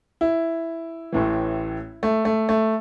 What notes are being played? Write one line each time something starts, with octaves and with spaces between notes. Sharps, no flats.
E4
A1 A2 E3
A3
A3
A3